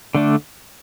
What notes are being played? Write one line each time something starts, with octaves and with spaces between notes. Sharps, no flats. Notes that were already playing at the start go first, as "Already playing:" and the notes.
D3 A3 D4